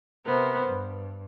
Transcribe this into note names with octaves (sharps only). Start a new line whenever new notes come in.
C3 B3 A#4 C5
G2